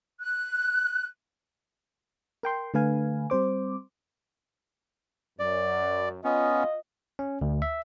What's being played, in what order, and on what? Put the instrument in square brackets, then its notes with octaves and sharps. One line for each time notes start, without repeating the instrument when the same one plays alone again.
[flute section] F#6
[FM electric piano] A#4 G5 C6
D3 A3 B4 F5 G#5
G3 C4 C5 D6
[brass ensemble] F#2 [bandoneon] D5
[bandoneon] B3 C#4 [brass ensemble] F4 D#5
[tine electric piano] C#4
D2
E5